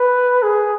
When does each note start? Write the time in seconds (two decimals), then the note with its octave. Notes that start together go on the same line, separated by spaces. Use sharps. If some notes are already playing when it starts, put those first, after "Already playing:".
Already playing: B4
0.42 G#4